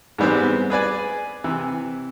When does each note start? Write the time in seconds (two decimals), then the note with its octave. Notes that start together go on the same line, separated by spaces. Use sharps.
0.18 G#2 E3 G3 B3 C4
0.70 G#4 B4 D5 G#5
1.44 C3 E3